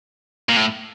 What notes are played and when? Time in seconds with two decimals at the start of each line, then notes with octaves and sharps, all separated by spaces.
0.49 A#2
0.57 A2